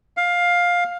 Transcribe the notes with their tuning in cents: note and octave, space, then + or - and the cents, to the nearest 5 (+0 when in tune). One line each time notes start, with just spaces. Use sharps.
F5 +15